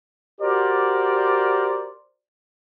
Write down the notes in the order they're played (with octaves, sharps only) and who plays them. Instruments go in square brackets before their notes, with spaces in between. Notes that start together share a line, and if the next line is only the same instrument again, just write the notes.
[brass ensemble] F#4 G4 A#4 C5 D5